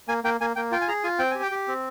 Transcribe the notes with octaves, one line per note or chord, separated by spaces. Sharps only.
A#3 G#5
A#3 G5
A#3 G#5
A#3 G5
F4 G5
G#5
G#4 A#5
F4 G#5
C4 G5
G4 G#5
G5
G4
C4